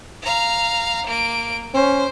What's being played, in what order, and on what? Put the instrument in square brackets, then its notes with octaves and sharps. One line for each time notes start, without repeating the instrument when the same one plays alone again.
[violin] F5 A#5
A#3 D7
[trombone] C#4 [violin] C5